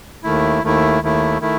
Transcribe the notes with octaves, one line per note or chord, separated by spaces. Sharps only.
D#2 D#3 A3 E4
D#2 D#3 A3 E4
D#2 D#3 A3 E4
D#3 A3 E4